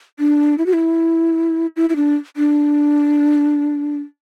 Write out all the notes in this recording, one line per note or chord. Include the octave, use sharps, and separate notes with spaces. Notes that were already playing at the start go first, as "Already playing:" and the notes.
D4
E4
F#4
E4
E4
E4
D4
D4